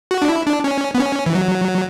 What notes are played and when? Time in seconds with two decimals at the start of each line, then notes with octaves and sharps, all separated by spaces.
0.11 F#4
0.22 D4
0.29 E4
0.46 D4
0.64 C#4
0.95 B3
0.99 C#4
1.26 E3
1.35 F#3